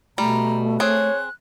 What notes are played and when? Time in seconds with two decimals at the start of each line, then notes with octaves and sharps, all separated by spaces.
0.18 B2 G3 A3 A#5
0.80 C4 G#4 C#5 F#6